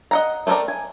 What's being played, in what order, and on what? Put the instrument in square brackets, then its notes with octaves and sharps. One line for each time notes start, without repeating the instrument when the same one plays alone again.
[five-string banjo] D#5 F#5 A#5
A3 B3 C4 A#4 D5
G#5